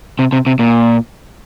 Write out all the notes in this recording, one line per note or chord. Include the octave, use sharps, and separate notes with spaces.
C3
C3
C3
A#2